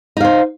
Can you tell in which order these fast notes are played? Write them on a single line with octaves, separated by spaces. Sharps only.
D#4 F5 C5